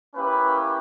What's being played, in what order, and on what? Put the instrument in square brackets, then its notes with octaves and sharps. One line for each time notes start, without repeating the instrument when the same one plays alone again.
[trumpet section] A#3 C#4 E4 G4 B4